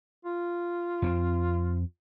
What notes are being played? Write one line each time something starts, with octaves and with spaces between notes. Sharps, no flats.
F4
F2 A#3 C4